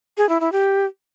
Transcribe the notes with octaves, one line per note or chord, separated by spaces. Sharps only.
G#4
E4
E4
G4